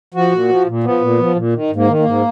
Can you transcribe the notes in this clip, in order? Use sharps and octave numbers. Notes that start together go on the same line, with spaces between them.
F3 F#4
A#2
F3
A#2
F3 B3
A#2
F3
A#2
D#3
G#2
A#3
D#3
A#3
G#2